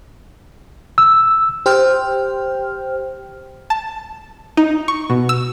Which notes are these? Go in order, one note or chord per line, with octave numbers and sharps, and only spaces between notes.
E6
G4 C5 G5 F6
A5
D#4
C#6
B2
E6